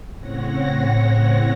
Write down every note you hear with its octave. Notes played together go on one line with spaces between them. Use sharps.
A2 C#3 C4 C#5 F#5 A#6